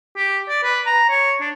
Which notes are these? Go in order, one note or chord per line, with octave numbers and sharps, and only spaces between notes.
G4
D5
B4
A#5
C#5
D4